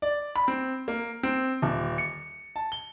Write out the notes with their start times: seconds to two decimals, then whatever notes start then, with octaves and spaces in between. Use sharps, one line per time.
0.02 D5
0.36 B5
0.48 C4
0.88 A#3
1.23 C4
1.62 D#1
1.98 C#7
2.56 A5
2.72 G7